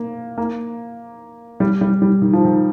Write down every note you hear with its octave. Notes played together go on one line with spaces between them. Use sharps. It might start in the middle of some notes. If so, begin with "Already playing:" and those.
Already playing: A#3
A#3
G3
G3
G3
D#3
F3
D#3